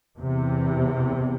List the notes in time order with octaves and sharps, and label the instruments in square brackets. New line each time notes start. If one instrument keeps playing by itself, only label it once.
[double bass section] E2 C3